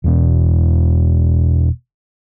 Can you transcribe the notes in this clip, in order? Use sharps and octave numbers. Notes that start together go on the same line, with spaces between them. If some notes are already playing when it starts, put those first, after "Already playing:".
E1 E2 B2